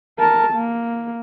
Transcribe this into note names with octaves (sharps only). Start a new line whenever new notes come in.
A#4 A5
A#3